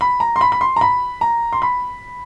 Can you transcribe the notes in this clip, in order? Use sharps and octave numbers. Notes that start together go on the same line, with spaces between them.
B5
A#5
C6
B5
B5
C6
A#5
B5
A#5
C6
B5